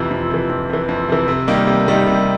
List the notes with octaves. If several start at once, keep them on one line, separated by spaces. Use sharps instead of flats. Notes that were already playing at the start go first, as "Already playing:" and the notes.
Already playing: F2 C3 E3
F2
C3 E3
F2
C3 E3
F2
C3 E3
C3
D#3 G3 A#3 D#4
C3
D#3 G3 A#3 D#4
C3